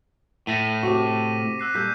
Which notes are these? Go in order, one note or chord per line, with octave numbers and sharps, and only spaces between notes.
A2 A3 A#6 B6 D#7
C3 C4 F#4 C#6 D6
E6 F#6 C7
A#2 G3 A4 E6 G6 B6